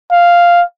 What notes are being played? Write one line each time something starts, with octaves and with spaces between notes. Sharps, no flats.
F5